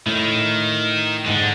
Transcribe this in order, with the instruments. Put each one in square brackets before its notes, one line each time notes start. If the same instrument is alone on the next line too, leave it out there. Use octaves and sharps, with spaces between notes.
[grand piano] A2 [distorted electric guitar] D#3
[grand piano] G#2 [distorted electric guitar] D3